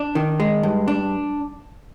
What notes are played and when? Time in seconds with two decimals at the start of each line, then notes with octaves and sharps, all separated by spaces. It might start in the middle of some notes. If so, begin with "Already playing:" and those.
Already playing: D4
0.15 D#3
0.40 G#3
0.63 G2
0.88 D4